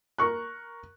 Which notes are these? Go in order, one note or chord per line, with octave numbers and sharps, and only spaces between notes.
A#4 C#6 F#6